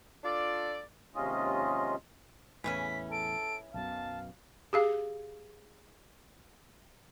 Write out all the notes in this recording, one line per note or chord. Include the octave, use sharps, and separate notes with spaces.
D4 F4 A4 D5
D#2 C3 G#3 C#4 F4 D#5
E2 A2 C#3 E3 C#4 B6
A4 D7
B1 F#2 B2 F5 A5
G4 G#4 F5